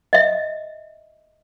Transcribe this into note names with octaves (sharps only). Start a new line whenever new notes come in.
D#5 E5